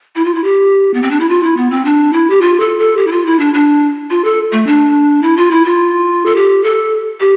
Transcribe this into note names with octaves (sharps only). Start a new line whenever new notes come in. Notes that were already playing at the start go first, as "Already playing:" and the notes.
E4
F4
E4
G4
B3
C4
D4
E4
F4
E4
B3
C4
D4
E4
G4
F4
A4
A4
G4
E4
F4
E4
D4
D4
F4
A4
A3
D4
E4
F4
E4
F4
A4
G4
A4
G4